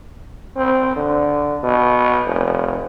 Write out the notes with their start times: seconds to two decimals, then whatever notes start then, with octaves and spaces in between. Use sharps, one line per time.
0.57 C4
0.96 D3
1.63 B2
2.26 F1